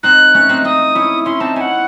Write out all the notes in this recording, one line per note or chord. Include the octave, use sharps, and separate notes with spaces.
C4 D#4 F#6
A3 C#4
C4 D#4
C4 D#4 D#6
C#4 E4
C#4 E4 C6
C4 D#4 A5
C#4 E4 F#5 G#5